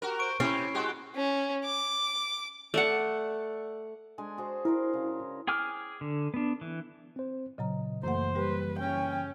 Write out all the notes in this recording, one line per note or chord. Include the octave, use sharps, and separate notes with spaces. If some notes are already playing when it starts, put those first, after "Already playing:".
F#4 G4 A#4
C5 C#6 D7
C3 C#4 E4 G4 C7
G#3 F#4 G4
C#4
D6
A3 D5 F#5
G#3 D4 G#5
F#4 G#4 C5
E4 A#4 C5
C#3
G#4 G5 G#5 D6 F6
D3
B3 D4
E3
C4 C5
A#2 C#3 F#3 D#5 A#5
F#2 E3 A3 A#3 C5 F#5
G3 G4 B4
C#3 C#4 G5